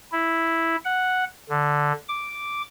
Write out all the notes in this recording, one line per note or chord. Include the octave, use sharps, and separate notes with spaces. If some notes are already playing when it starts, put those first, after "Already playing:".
E4
F#5
D3
D6